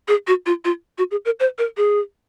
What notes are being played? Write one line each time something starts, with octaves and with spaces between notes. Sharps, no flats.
G#4
F#4
F4
F4
F#4
G#4
A#4
C5
A#4
G#4